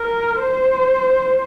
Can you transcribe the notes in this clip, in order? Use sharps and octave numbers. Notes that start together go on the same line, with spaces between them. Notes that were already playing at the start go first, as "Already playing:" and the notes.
Already playing: A#4
C5